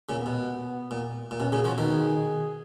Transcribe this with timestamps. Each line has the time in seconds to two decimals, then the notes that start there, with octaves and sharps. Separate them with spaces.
0.09 A#2 C#3
0.18 B3
0.26 B2
0.91 A#2
1.31 A#2
1.40 B2 C#4
1.52 A#2 C#3 G#4
1.64 C#3 F3 F#4
1.78 B2 D#3
1.89 G#4